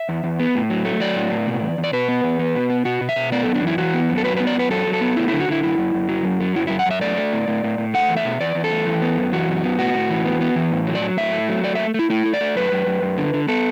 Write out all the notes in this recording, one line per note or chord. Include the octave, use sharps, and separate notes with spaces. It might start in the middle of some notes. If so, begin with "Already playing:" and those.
Already playing: E5
E2
E2
B3
A2
F#3
A3
F#3 D5
A2
A2
B2
E2
E2
D5
B2 B4
B3
E2
B3
B2
B3
B2 F#4
B2
E5
B2
B3 D5
F#2 A4
D4
E3 E4
E3 F#4
B3
F#2
A4
F#3 B4
B3 B4
D5
F#2 B4
F#3 A4
F#3
A4
B3
A3 E4
D3 E4
F#4
D3 E4
F#2 E4
F#2
F#2
F#3
F#2
F#3
F#2 E4
F#2 E4
F#5
F#2 E5
A3 D5
A3
A2
A2
A2
A2
A3 F#5
E2
E5
B2
E2 D5
E2
A4
A3
E3
B3
F#2
E3 F#4
F#2
B3
A2 F#4
A2
E3
B3
B3
E3
A2
F#3
D5
F#3
A2 E5
A3
F#3
A3 D5
A3 E5
A3 E4
A3 E4
A3
D5
A3
F#2 B4
F#2
F#2
F#2
D3
D3
B3 A4